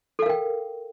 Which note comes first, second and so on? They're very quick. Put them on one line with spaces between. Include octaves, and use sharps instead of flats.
A4 F5 A#4 G5